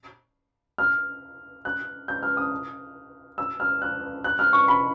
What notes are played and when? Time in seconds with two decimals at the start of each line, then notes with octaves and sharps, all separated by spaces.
0.78 F6
1.65 F#6
2.08 G6
2.23 F6
2.37 D#6
3.38 E6
3.60 F6
3.82 F#6
4.24 F#6
4.39 F6
4.53 C#6
4.68 B5